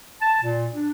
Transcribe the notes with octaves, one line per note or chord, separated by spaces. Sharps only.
A5
A#2
D4